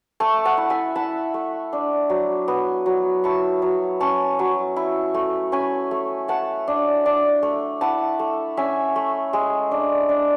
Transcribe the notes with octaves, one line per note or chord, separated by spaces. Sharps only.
A3 A5 C#6
F#5 A5
E4
E5 G#5
E4 F#5 A5
A3
D4
F#3
B3
F#3
E4 A5 C#6
F#3
C#4 A5 C#6
F#3
E4
A3
C#4 G#5 B5
A3
A3 F#5 A5
D4
D4
A3
E4 F#5 A5
A3
C#4 E5 G#5
A3
G#3
D4
D4